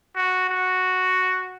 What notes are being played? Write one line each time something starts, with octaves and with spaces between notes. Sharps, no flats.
F#4
F#4